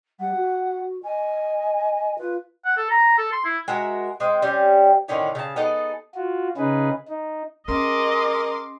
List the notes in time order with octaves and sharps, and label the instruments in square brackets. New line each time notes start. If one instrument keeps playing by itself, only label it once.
[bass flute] G3 [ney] F#5
[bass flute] F#4
[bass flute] D#5 [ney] G#5
[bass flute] F4 [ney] B4
[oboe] F#5
A4
A#5
A4
C6
E4
[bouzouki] G#3 F#4 A#4 E5
G#3 C4
G3 C4 C#4
A2 D3 D#3 C#4
C#3 A5
B3 D#4 G#4 A4
[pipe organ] F4 F#4
C#3 C#4 D#4 G#4 B4
D#4
[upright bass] C#4 [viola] G#4 D#5 [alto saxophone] A#4 [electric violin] C6 D6